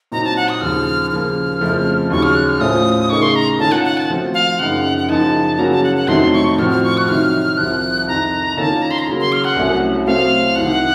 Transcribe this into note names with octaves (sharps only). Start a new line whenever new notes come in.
A#2 F#3 C4 D#4 A#5
A5
F#5
D#6
D#2 C#3 F3 F6
C#3 F3 A#3 F6
F2 C#3 F3 A3
D#2 C#3 F#3 C#6
F6
F#6
F6
A2 A3 C#4 F4 C5 D#6
C#3 A3 D#4 A#4 C#6
C6
A#5
D#3 A#3 C#4 F4 A4 A5
F#5
F#5
A5
F3 A3 C4 F#4
F5
F#2 C#3 F3 A#3 D#4 F#5
F#5
F#2 C#3 F3 A#3 D#4 A5
C#3 F#3 A#3 C#4 F#4 A#5
A5
F#5
F#5
F2 C3 D#3 F#3 A3 C6
C#6
A2 F3 C4 F#4 F6
F6
C#6
F#6
C3 D#3 F#3 F6
C2 C3 F3 F#6
F2 C3 D#3 A#5
D#3 A#3 C#4 F4 A4 A5
A#5
C6
A#5
C#3 F#3 A#3
C6
F6
F#5
C2 C3 F#3 A3 C#4
C3 F#3 A3 C4 F5
C2 C3 D#3 F#5